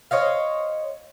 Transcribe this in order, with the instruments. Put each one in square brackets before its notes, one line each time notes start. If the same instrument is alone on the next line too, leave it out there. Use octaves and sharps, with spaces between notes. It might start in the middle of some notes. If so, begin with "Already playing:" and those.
[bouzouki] C5 C#5 D#5 F5